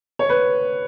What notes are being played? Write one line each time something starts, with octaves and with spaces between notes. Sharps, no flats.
C#5
B4